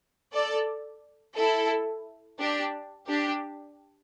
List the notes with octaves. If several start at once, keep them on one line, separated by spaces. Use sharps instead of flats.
A4 D5
E4 A4
D4 G4
D4 G4